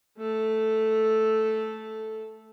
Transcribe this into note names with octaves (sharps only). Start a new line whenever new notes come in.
A3 A4